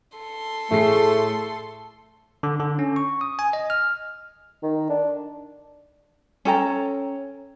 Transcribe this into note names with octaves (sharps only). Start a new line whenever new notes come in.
A4 C6
A2 A3 G#4 C7
D3
D3
C#4
C#6
D#6
G#5
D#5
F6
D#3
D4
C#4 A4 G5 A#5